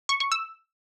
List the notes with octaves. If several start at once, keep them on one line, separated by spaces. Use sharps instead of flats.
C#6
C#6
E6